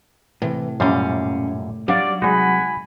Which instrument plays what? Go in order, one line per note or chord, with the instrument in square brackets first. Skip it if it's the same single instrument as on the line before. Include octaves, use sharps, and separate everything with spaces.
[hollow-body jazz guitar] A2 C3 [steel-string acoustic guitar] E3
[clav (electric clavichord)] F#2 A#2 G3 [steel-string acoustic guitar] C#4 F5
[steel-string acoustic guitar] F#3 [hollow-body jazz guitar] G3 D4 F5 [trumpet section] D5
[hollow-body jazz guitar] C2 G#3 [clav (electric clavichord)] D#4 F#4 [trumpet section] F#5 G#5 B5